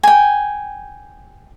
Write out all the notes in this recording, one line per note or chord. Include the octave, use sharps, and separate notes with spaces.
G5 G#5